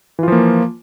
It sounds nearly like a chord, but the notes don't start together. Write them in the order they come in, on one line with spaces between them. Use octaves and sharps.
E3 F4 F3 A#3